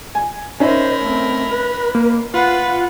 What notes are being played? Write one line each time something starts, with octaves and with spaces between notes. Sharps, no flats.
G#5
C#4 D#4 A#4 C5 D#5 E5 B5
A3 C4
B4
A#3
F4 B4 F#5